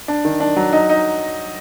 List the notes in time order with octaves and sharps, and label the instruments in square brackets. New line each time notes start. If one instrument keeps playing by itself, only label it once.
[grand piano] D4
D#3
D4
F#3
D#4
D#4